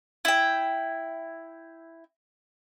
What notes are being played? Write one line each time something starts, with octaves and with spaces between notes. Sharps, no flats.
E4 G5